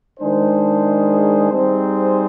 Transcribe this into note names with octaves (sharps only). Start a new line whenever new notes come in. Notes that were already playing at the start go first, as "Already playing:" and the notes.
D#3 G#3 D4 G#4 C5
G3 C4 D#4 G#4 C5